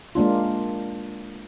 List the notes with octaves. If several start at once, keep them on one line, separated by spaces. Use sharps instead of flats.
G#3 A#3 D4 F4